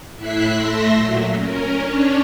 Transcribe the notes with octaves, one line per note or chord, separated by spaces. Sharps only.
A2 E4 E5 F#6 B6 C7
A3 E5 C6 A#6
A#2 F#3
C#4 A#4
C#4 D4 C#5